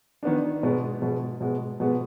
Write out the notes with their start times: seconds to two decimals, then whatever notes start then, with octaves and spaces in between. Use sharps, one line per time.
0.23 D#3 B3 D4
0.63 B2 G#3 B3
1.02 B2 G#3 B3
1.40 B2 G#3 B3
1.80 B2 G#3 B3